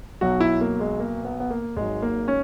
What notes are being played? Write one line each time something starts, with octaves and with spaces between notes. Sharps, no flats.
B1 B2 F#3 F#4
E4
A#3
G#3
A#3
B3
B3
A#3
G#1 G#2 F#3 G#3
A#3
C#4